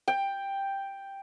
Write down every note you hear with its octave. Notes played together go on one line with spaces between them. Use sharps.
G5